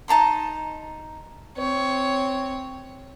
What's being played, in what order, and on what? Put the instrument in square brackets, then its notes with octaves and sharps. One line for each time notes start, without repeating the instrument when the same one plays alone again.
[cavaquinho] D#4 A5 A#5 C6
[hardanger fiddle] C4 C#5